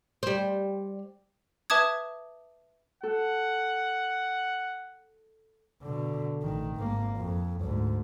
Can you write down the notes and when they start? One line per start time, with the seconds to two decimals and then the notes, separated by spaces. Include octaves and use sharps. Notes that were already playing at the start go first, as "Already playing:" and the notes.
0.23 G3 C5
1.70 B4 E5 A5 D6 D#6 G#6
3.03 A4 F#5
5.83 B2 D3
6.42 A1 D#3
6.76 G#1 A#3
7.17 F2
7.62 D2 G#2